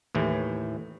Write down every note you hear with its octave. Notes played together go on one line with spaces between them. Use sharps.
D#2 A2 E3